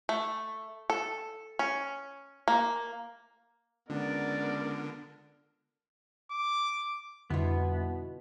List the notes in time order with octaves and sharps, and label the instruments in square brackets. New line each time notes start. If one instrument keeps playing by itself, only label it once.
[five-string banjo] A3
A4
C#4
A#3
[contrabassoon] C#2 [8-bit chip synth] D3 [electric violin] B3 A#4 [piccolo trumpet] D5
[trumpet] D6
[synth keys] F2 D3 G3 [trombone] B2 [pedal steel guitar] B3 [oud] E4 F4